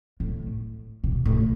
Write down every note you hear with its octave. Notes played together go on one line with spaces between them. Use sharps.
A2
B2
A2